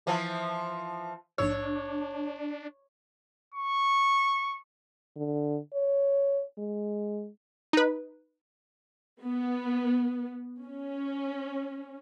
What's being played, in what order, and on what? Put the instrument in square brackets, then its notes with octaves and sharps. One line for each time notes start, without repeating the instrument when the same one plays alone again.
[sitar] E3 F3
[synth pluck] A#1 G#2 E6 [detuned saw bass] D4 [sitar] C#5
[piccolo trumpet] C#6
[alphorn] D3
C#5
G#3
[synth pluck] D#4 B4
[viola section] B3
C#4